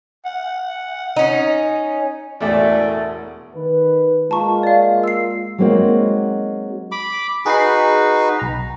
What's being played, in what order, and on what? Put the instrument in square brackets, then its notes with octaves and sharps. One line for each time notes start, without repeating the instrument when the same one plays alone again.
[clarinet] F#5
[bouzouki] C#4 D#4
[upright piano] E1 A1 G#5 [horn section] A3 [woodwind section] D5
[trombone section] D#3 B4
[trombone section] G#3 A#3 F4 [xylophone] A5 A#5 C#6
[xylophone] D5 F5
E6 C7
[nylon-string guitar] F#3 G#3 A#3 C4 D#4 F#4
[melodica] B5 D6
[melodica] D#4 F#4 B4 [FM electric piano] G#4 B5 C7
[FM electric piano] B1 A#5